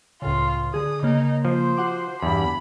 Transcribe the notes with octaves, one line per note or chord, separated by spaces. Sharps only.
C#2 A2 C#3 F4
D3 G#4 D#6
C#3 A#3 D#4
F3 C5
F#4 F#5 D6
E2 G2 B5